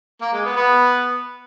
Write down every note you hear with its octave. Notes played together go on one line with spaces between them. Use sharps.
A#3
G#3
B3
B3